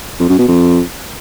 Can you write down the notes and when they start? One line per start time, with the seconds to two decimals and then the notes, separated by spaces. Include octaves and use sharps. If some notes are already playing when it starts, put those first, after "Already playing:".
0.20 F2
0.29 F#2
0.39 B2
0.48 F2